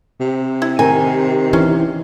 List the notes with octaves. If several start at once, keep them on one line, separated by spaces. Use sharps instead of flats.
C3
E4
D#3 G#5
E3 C#4